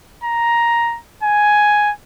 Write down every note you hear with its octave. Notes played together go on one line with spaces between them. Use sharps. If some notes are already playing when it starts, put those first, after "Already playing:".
A#5
G#5